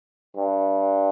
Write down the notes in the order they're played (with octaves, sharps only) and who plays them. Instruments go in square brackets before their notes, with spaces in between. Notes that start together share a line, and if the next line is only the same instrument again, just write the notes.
[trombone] G2